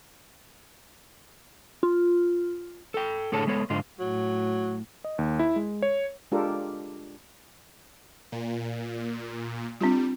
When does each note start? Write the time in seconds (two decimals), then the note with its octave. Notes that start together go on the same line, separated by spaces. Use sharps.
1.83 F4
2.94 A4 G5
3.32 A2 D3 G#4 A4 C#5 A5
3.47 G#3 B3 A4 C#5
3.70 G#2 D3 F4 D#5
4.00 A2 F#3
5.04 D#5
5.18 D#2
5.39 E4
5.56 G#3
5.82 C#5
6.32 G#3 D4 F4 G4 A4 A#4
8.32 A#2
9.81 G3 C4 D4 F4